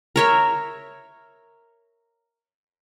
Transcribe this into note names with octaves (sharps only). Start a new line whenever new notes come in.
A#4 C#5 E5